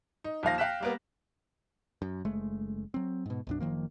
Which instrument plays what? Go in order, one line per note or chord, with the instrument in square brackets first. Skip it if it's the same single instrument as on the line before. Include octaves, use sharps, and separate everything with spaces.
[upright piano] D#4
D#2 F3 F5 A#6
F5 G5 F#6 B6 E7
G3 A#3 B3
[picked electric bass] F#2
F#1 G#3 A3
F#3 C4
G#2 B2
B1 F#2 D4
F#1 D#3 F3 A#3